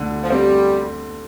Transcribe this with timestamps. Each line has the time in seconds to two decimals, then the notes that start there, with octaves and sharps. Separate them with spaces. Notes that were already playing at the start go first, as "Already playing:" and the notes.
Already playing: D2 D3
0.23 F3
0.30 G3 C4